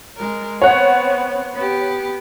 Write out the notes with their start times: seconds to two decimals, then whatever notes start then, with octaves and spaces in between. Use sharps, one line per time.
0.18 G#3 A#4
0.62 B3 C4 C#5 F#5
1.55 B3 G4